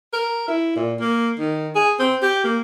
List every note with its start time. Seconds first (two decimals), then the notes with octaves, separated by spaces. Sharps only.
0.13 A#4
0.48 E4
0.76 A#2
1.00 A#3
1.39 D#3
1.75 G#4
1.99 C4
2.23 G4
2.44 A#3